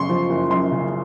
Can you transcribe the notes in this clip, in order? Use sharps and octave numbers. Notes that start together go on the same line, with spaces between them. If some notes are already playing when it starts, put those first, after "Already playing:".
Already playing: F#2 C#3 C6 C#6
F3
F#1
F#2 C6
C#3